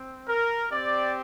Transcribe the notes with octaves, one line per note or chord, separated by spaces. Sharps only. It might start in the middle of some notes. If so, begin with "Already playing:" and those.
Already playing: C4
A#4
C4 G4 D5